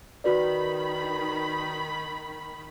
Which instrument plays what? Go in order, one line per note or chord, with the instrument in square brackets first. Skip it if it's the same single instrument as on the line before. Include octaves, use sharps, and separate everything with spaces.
[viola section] D#3 B5 [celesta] F#4 B4 D5